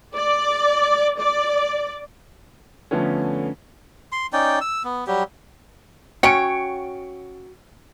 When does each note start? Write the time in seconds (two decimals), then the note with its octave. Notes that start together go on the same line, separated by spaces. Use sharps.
0.14 D5
1.19 D5
2.91 D3 F3 A3 B3 C#4
4.12 C6
4.33 C#4 D#4 D5 G5
4.61 E6
4.84 B3
5.07 F#3 G3 G4
6.23 C#4 F#4 C#5 G5 C#7 D7